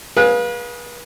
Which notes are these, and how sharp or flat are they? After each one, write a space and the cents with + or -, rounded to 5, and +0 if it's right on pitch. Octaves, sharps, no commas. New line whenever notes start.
G#4 +0 B4 -35 F5 +15